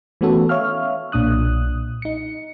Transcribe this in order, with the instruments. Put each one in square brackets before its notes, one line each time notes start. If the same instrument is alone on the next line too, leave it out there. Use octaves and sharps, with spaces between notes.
[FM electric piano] E3 A3 B3 C#4 F#4 A4
C#5 E5 F5 F6
B1 A#2 D4 D#6 F#6
D#4 C#7